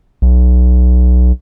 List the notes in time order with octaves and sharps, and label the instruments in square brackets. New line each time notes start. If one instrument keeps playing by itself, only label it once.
[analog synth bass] B1